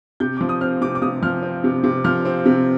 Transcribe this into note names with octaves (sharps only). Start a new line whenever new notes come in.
C3 G6
F3 D6
D#6
C4 F6
C3 D6
D6
C3 D#6
F3 F6
C4
C3
C3
F3 F6
C4
C3